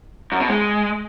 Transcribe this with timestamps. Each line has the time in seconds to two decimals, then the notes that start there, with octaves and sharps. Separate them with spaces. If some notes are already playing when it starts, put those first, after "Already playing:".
0.32 F#2
0.40 B2
0.49 G#3